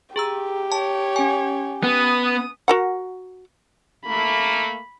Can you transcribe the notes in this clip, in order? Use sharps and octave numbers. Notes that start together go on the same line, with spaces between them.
G4 G#4 A#5 E6
C#5 A5
C#4 G#5
B3 D#6
F#4 A#4 F#5
A3 A#3 B5